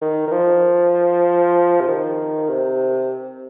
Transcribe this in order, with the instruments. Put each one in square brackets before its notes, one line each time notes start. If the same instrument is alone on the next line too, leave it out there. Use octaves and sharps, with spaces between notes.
[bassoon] D#3
D#3
F3
C3
D#3
C3